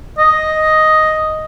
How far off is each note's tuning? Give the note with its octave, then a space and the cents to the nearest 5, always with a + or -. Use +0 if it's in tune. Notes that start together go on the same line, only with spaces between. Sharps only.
D#5 +5